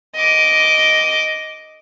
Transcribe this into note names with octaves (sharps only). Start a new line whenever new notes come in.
D#5 D6